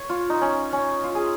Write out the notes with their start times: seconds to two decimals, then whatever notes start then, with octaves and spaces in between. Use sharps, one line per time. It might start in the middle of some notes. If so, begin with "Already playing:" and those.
Already playing: C#5
0.10 F4
0.30 D#4
0.41 C#4
0.73 C#4
1.04 F4
1.15 G#4